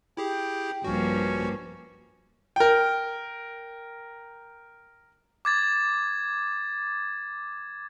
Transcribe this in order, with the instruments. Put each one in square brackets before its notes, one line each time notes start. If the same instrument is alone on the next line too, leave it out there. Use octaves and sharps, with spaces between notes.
[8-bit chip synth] E4 G4 G#4 [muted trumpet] G5
[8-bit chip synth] A#1 F#4 [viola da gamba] G2 F3 A#3 [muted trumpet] C#4
[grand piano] A#4 G5
[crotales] D6 G#6 A6